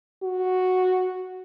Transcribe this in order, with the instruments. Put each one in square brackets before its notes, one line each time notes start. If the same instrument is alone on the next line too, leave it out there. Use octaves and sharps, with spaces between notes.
[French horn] F#4